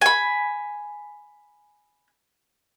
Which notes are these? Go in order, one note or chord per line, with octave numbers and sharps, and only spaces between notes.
G#5 B5